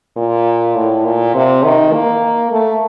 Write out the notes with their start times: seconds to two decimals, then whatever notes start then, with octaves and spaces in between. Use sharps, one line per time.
0.16 A#2
0.75 A2
1.05 A#2
1.34 C3
1.63 D#3
1.93 A#3
2.52 A3